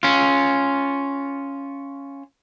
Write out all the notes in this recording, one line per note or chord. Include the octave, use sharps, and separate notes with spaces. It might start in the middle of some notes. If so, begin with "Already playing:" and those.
C#4 F4